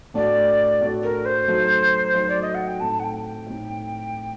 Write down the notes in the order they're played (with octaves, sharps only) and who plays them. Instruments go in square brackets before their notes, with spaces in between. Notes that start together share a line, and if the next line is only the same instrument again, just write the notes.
[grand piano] A2 A3 D4 F#4 [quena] D5
[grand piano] A2 A3 D4 F#4
[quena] A#4
C5
[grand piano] F#3 A3 D#4 F#4
F#3 A3 D#4 F#4
[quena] D5
D#5
F#5
G5
[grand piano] A2 A3 C4 D#4 [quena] A5
[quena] F#5
G5
G5
[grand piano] A2 A3 C4 D#4